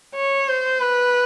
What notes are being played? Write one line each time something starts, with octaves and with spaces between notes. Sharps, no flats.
C#5
C5
B4